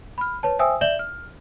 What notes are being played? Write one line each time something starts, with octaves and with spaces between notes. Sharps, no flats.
B5 F6
B4 C#5 A5
C5 E5 G5 G#5 D#6 E6
D5 E5 G6 E7 F#7 G7
F6